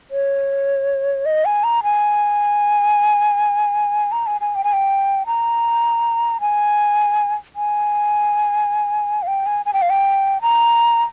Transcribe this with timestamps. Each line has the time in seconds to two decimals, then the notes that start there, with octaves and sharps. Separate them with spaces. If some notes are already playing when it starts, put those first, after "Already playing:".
0.11 C#5
1.26 D#5
1.45 G#5
1.64 A#5
1.84 G#5
4.12 A#5
4.27 G#5
4.41 G#5
4.55 G5
4.64 G#5
4.73 G5
5.27 A#5
6.41 G#5
7.56 G#5
9.23 F5
9.27 G5
9.46 G#5
9.66 G#5
9.73 G5
9.82 F5
9.90 G5
10.42 A#5